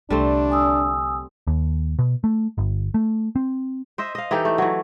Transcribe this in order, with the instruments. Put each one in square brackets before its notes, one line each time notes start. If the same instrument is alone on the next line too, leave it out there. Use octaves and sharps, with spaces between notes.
[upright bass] C2 D3 [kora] G3 A3 C4 [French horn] D4
[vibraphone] G#5 D#6 E6
[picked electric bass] D#2
B2
A3
G1
A3
C4
[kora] C5 D#5 E5
D#5 F5
E3 D#4 G4 A4
A3
E3 F#3